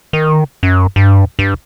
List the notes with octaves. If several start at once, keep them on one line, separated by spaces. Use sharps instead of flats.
D#3
F#2
G2
G2